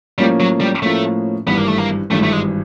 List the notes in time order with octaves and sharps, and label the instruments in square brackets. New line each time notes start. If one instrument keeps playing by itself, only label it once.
[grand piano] A2 F3 A#3 C#4 [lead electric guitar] G3
[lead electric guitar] F#3
G3
[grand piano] A2 F3 A#3 C#4 [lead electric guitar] A3
[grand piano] G#1 G2 E3 [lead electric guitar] B3
[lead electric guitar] A#3
A3
A#3
[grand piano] G#1 G2 E3 [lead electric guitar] A3
[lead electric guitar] A3
G#3